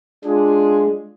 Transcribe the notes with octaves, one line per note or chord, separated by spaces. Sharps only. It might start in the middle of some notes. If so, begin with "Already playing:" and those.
G#3 D4 F4 G#4